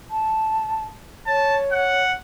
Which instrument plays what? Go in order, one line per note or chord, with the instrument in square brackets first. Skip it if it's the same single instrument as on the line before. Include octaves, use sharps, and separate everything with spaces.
[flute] A5
[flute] C#5 [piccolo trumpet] A5
[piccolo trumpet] F#5